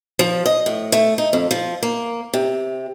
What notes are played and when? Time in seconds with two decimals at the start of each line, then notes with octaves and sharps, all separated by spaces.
0.19 F3
0.46 D#5
0.66 A2
0.92 A3
1.18 D#4
1.33 F2
1.51 F3
1.83 A#3
2.34 C3